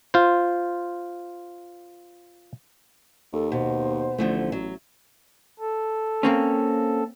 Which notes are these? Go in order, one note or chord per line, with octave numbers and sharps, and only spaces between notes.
F4 C5
D#2 A4
B2 C5
A1 D3 F3 A3
F#3
A4
A#3 C4 C#4